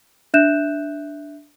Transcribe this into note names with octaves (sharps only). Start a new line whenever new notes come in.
D4 E5 F#6 G6 E7